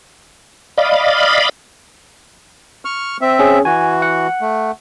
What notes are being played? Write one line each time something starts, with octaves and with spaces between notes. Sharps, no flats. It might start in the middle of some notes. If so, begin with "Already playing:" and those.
D5 D#5 F5 B5
C#6 F6
C4 E5
C#4 G#4
E3 F#4 G#5
F#5
A3